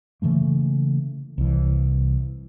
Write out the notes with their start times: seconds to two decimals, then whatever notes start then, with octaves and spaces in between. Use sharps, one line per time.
0.22 C#3 E3 A3 A#3
1.38 C2 E3